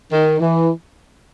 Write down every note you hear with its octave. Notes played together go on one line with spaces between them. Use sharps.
D#3
E3